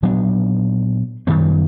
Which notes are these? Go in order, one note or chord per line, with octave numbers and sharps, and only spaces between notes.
A#2 F#3 B3 D4
F#2 D#3 G3 B3